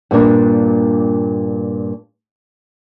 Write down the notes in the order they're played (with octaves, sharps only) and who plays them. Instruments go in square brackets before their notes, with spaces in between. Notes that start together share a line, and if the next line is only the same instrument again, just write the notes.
[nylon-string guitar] G2 A#2 A#3 D4